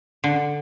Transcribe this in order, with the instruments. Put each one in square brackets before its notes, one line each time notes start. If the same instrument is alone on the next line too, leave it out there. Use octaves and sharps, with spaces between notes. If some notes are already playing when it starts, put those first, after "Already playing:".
[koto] D3